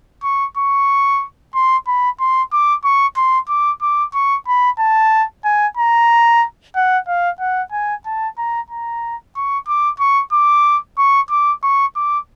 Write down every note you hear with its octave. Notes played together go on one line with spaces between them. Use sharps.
C#6
C#6
C6
B5
C6
D6
C#6
C6
D6
D6
C#6
B5
A5
G#5
A#5
F#5
F5
F#5
G#5
A5
A#5
A#5
C#6
D6
C#6
D6
C#6
D6
C#6
D6